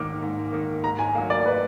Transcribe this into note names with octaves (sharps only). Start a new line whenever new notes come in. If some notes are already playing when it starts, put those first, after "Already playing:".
Already playing: G#2 D#3 A#3 D6
G#2
D#3 A#3
G#2 A#5
G#5
F#3 A#3 F5
D5
B4